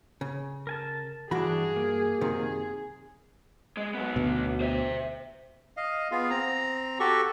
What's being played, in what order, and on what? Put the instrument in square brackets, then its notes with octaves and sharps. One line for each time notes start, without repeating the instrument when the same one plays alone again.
[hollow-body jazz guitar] C#3
[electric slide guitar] A#4 G#5 A5
[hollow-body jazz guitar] G2 F#4 B5 [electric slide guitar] E3 D4 [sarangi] G#4
[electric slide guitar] A#3
[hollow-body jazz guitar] F#2 C3 D#3 [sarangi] G#4
[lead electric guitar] G#3
F#3 B3
[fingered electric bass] D2 B2
[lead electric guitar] C5 E5
[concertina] D#5 F5
B3 F4 G#4 F5
C4 A#5
F#4 G4 A4 C#6